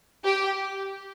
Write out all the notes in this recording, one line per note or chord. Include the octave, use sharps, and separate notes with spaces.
G4